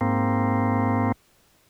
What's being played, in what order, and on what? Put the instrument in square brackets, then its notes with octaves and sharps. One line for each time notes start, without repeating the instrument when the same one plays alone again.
[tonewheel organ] G#2 A#3 C4